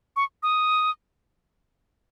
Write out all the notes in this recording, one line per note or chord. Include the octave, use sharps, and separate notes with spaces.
C#6
D#6